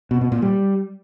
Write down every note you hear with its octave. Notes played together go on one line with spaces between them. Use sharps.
B2
B2
A#2
G3